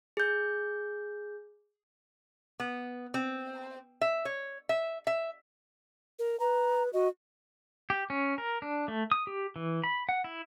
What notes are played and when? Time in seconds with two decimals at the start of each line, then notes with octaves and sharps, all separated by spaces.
0.17 G#4 G6
2.60 B3
3.14 C4
4.01 E5
4.25 C#5
4.69 E5
5.07 E5
6.19 A#4
6.40 B4 A#5
6.93 F#4 D#5
7.90 G4
8.10 C#4
8.38 A#4
8.62 D4
8.88 A3
9.12 D#6
9.27 G4
9.56 E3
9.84 B5
10.09 F#5
10.24 E4